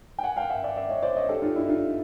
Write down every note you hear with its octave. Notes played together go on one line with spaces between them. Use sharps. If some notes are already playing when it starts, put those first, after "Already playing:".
G5
F#5 G#5
F5 G5
E5 F#5
D5 E5
D5 E5
C#5 D#5
C5 D5
C#5 D#5
G4 A4
D#4 F4
D4 E4
D#4 F4